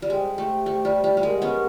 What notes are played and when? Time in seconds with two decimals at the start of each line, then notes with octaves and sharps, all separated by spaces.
0.02 G3
0.09 G#3 G4 C5 E5 G5
0.38 A3
0.66 A3
0.85 G3
1.04 G3
1.17 G3
1.23 G#3 G4 A#4 D#5 F#5
1.42 B3 C#4